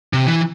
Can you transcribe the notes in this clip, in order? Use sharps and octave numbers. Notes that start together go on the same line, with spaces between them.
C3
E3